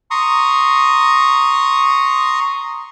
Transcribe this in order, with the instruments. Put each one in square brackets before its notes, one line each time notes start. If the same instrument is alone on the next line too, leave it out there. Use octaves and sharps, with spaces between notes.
[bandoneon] A#5 C6 C#6 D#6